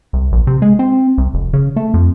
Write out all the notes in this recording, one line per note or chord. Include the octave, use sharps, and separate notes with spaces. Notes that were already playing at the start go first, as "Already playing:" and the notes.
C2
A#1
C3
G#3
C4
C2
F1
C#3
A3
F2